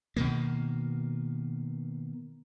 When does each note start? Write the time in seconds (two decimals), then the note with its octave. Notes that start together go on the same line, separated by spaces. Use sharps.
0.17 B2 D#3 A#3